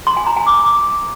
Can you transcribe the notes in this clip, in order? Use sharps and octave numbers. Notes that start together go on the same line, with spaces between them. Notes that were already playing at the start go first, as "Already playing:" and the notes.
C6
G#5
A#5
G#5
D6